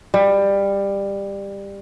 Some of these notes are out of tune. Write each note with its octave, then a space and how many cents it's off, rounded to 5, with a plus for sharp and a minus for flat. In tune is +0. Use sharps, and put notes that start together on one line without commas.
G3 +20